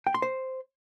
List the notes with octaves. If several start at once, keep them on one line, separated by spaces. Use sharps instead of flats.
G5
C6
C5